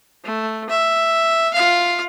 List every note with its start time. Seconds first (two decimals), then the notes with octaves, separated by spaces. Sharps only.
0.24 A3
0.69 E5
1.53 F4 F5